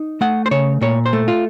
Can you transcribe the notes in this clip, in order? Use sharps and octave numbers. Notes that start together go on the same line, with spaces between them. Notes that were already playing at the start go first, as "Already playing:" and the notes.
Already playing: D#4
A3 F#5
C5
C#3 C#5
A#2 C#5
C5
A3
F4